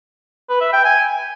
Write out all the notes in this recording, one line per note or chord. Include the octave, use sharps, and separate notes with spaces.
B4
E5
G5
G#5